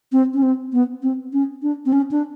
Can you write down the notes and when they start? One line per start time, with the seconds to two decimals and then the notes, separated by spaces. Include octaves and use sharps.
0.12 C4
0.34 C#4
0.42 C4
0.73 B3
1.03 C4
1.33 C#4
1.62 D4
1.86 C4
1.93 C#4
2.11 D4